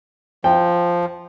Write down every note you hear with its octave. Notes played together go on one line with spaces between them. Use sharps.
F3 G5